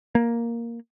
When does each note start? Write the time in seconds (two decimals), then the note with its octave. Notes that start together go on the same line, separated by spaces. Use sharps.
0.15 A#3